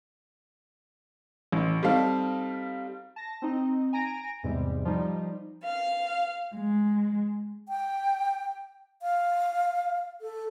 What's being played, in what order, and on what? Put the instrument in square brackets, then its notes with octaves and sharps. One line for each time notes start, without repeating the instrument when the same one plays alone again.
[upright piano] A1
G3 C4 D#4 A4 F5
[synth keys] A5 A#6
C4 D#4
G#5 A#5 A#6 D7
E2 G#2 C3 G3
F3 G3 D#4
[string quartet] F5
G#3
[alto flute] G5
F5
A4